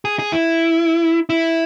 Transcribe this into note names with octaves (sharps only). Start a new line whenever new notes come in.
G#4
G#4
E4
E4